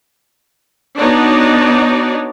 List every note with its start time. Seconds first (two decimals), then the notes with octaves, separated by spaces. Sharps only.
0.98 B3 D4 D#4 F#4 C#5 D5